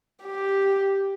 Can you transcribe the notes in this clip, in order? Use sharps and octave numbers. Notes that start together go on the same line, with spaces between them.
G4